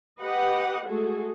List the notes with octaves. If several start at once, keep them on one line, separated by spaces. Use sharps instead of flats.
G4 B4 D#5 F#5
G#3 A3 F#4 G#4 A4